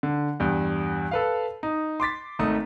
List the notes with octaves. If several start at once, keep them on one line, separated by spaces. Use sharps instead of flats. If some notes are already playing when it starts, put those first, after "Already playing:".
D3
E2 G2
A4 B4 F5
D#4
C6 D6 A6 B6
G#1 A3 D#4 D#6